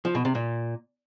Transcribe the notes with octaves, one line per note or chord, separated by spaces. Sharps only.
F3
B2
C3
A#2